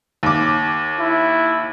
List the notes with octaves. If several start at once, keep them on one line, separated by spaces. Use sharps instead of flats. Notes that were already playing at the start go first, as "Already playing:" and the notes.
D#2 D6
E4